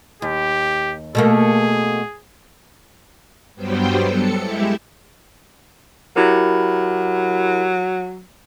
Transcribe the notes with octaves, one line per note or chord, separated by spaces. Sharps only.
D#2 G4
B2 A3 A#3 G#4
G2 F#3 G3 B3 C5 G5
A4 C#7
G#3 E4 G4 E5
F#3 E4 G4 A#4